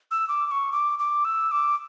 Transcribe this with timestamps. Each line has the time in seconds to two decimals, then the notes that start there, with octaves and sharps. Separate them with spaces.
0.11 E6
0.28 D6
0.46 D6
0.51 C#6
0.72 D6
0.99 D6
1.25 E6
1.52 D6